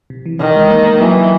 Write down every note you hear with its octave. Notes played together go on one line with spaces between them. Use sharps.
C3
E3
C3 D#3
G#3
A#3
A#3
E3 F#3